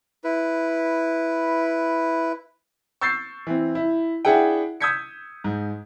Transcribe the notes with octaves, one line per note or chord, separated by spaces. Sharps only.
E4 B4
C#6 E6 G6 A6 C7
E3 C4
E4
D4 E4 G#4 E5 F#5 G5
D#6 E6 G6 G#6 B6 C#7
G#2